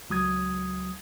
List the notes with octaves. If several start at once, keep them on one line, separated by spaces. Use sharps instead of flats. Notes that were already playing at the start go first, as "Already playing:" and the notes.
C#2 F#3 D#6 G#6